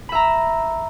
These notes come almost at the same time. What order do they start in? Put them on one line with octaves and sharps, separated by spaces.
B5 E5 A#5